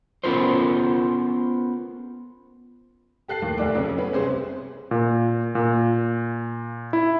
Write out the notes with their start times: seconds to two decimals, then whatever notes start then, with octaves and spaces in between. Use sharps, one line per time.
0.24 B3 C#4 F4 A4 A#4 C5
3.28 G4 A4 F#6 C7
3.42 D#2 A2
3.58 F1 D2 D4 D6
3.75 F2 C#3 F#3
3.97 B3 C#4 B4
4.13 C2 C3 G#4 C5
4.91 A#2
5.55 A#2
6.93 E4